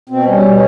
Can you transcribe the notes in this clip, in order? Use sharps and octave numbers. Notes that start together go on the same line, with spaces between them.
B2 C4
G3 C#4
B2
C#4